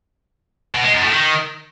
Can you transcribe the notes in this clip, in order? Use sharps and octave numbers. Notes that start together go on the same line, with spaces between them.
B2
G#3
F#2
A2
D#3